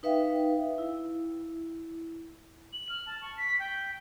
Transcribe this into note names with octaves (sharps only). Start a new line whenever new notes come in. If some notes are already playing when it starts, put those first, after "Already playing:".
D#4 B4 E5 F5 G5
E4
F#7
F6
A5
C#6
B6
G5